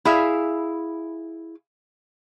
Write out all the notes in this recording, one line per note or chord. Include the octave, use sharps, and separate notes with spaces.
E4 G#4 E5 F5